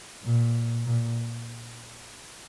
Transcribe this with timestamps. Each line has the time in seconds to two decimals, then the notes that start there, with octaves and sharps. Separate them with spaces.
0.24 A#2
0.85 A#2